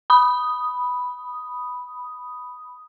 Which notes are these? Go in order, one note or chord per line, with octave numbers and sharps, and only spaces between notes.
B5 D#6